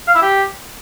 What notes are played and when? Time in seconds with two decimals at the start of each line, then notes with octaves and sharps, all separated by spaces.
0.07 F5
0.15 E4
0.22 G4